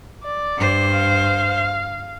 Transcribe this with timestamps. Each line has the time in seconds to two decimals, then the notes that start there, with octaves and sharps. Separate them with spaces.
0.23 D5
0.57 G2 C5
0.92 F5